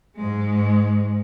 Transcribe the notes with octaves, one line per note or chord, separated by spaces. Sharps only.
G#2 G#3